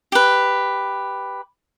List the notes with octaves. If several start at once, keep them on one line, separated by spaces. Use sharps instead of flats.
G4 B4